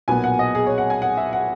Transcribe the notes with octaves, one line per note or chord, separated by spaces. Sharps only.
B1 A#2 F#3 B3 G#5
F#5
D#5
G#4
C#5
F#5
G#5
F#5
E5
F#5